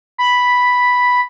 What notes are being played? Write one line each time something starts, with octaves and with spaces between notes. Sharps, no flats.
B5